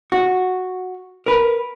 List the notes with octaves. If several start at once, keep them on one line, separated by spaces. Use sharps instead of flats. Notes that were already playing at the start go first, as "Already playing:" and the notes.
F#4
A#4 B4